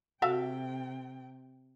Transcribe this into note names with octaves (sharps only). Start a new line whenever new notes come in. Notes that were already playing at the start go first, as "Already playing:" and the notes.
C3 F#4 A4 E5 F5 G5